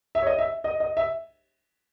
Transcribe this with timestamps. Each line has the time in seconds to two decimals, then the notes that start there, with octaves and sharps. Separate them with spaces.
0.15 E5
0.23 C#5
0.27 D#5
0.39 E5
0.64 D#5
0.80 D#5
0.97 E5